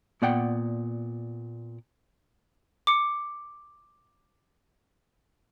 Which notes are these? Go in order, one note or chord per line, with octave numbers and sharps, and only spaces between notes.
A#2 B3 D5 F#5 G5
D6 C#7